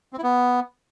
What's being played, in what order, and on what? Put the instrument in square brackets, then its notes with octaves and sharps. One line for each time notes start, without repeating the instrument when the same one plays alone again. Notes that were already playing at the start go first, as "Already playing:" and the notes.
[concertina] C4
E4
B3